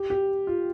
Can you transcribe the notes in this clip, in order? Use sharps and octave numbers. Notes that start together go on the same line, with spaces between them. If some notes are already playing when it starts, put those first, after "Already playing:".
Already playing: G4
G4
F4